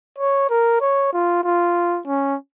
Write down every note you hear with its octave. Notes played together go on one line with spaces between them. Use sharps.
C#5
A#4
C#5
F4
F4
C#4